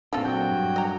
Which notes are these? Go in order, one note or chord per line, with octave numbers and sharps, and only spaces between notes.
A#2 A#3 C4 D4 F4 A4
F#3 G5
G2
D#5 A#5